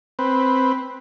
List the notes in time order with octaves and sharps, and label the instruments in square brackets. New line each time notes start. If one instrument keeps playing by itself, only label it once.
[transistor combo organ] C4 B4